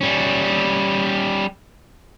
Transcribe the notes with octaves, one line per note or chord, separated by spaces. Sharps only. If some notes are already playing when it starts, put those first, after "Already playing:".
G3 C#4